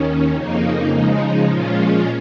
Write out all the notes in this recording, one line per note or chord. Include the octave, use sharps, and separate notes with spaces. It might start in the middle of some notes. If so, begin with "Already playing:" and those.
Already playing: D#2 D#3 C#4
F2 C#3 A#3 D#4
C#3 F3 G#3 D#4
A#2 F3 G#3 C#4 F4